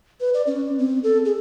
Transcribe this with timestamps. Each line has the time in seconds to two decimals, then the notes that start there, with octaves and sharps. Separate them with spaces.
0.21 B4
0.34 D5
0.47 C#4
0.78 C4
1.03 A4
1.25 G#4